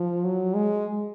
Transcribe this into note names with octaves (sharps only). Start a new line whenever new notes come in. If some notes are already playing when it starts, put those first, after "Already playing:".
Already playing: F3
F#3
G#3